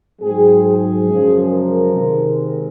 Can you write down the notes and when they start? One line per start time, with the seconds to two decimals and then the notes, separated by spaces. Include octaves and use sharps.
0.21 G#2 F#3 C4 G#4
0.64 G#4
1.07 F#2 C#3 F3 G#3
1.50 A#4
1.92 C3 D#3 G#3 C4
2.36 A#4